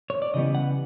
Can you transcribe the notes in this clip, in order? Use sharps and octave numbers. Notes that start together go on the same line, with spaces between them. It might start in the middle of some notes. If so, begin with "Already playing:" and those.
C#5
D5
C#3 E3 G3 B3 D#5
F#5